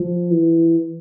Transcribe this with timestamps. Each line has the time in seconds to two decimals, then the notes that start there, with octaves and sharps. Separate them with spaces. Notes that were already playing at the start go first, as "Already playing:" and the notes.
Already playing: F3
0.31 E3